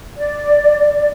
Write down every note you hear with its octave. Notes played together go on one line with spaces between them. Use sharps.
D5